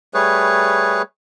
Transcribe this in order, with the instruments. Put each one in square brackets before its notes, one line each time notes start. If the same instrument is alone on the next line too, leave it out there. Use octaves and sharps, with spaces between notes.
[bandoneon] G3 A3 G#4 B4 C#5